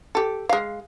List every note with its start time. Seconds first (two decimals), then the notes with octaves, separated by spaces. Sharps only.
0.15 G4 A4
0.49 G#3 F5